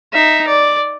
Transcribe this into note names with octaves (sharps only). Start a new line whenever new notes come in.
D#4 E5
D5